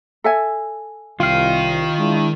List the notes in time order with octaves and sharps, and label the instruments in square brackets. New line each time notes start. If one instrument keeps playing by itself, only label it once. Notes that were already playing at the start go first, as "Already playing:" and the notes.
[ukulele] A4 E5 G#5
[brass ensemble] C2 [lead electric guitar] D#3 G5 [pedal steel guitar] F4 F5
[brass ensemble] G#3 D4 E4